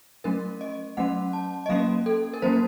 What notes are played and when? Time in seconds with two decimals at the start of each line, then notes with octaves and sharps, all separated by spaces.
0.24 F#3 A3 C#4 A#4
0.61 D#5
0.97 F#3 A3 C#4 F#5
1.33 A5
1.66 D#5
1.69 F#3 A#3 C#4 F5
2.06 A4
2.33 A#4
2.42 F#3 A#3 C#4 C5